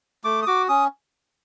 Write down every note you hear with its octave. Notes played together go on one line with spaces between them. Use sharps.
A3 D6
D#6
F#4 D6
C#4 D#6